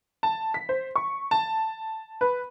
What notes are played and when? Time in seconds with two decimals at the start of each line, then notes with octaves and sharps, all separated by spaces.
0.23 A5
0.54 B6
0.69 C5
0.96 C#6
1.31 A5
2.21 B4